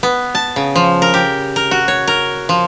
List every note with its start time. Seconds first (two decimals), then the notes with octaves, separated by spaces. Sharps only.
0.03 B3
0.35 A5
0.56 C#3
0.75 F3
1.02 A#4
1.14 G4
1.56 A#4
1.71 F#4
1.88 C#5
2.07 A#4
2.49 F3